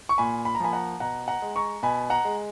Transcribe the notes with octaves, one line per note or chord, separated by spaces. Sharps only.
C#6
A#2 G#5 B5
B5
A#5
F3 A#3 G#5 B5
F#5 A#5
B2 F#5 A#5
F#5 A#5
G#3
A#5 C#6
B2 G#5 B5
F#5 A#5
G#3